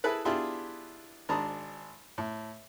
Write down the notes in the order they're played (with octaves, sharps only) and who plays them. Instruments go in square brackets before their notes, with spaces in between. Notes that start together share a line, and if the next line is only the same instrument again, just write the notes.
[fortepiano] E4 G#4 A4 B4
B3 D4 E4 F4 G4 G#4
G#1 G#3 D4 A5 A#5 D#6
A2